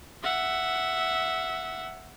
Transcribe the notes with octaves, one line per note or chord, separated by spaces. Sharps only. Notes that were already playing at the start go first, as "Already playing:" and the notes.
E5 F#5